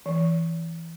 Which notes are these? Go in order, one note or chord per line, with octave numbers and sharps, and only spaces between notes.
E3